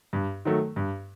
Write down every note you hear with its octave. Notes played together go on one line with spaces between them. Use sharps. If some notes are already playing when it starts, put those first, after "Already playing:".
G2
D#3 F#3 A3
G2